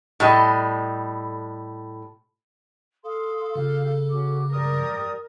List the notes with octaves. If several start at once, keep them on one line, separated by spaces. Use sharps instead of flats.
A2 G3 D#5
A4 F5 C6 D#6
C#3 F4 G4 F5
C#4 F#4 D6
G4 A#4 D5 D#6